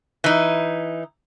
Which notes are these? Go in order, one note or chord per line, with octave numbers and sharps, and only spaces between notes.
E3 D#4